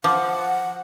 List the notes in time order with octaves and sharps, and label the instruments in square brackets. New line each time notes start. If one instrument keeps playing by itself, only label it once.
[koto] F3 [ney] F#5 [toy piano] C6 D6